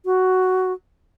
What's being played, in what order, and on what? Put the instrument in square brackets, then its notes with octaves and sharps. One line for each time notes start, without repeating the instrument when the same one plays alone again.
[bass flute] F#4